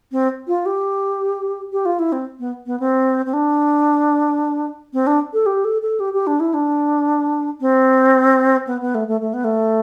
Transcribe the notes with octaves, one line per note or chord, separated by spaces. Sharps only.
C4
F4
G4
G4
F4
E4
C4
B3
B3
C4
C4
D4
C4
D4
A4
G4
A4
A4
G4
G4
D4
E4
D4
C4
B3
B3
A3
A3
A3
B3
A3